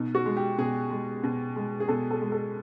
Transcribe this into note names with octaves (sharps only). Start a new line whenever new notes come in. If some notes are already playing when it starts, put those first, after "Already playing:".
Already playing: B2 D#4
F#4
G#3
G4
B2 G#4
G#3
B2
G#3
G#4
B2 A4
A4
G#3
A4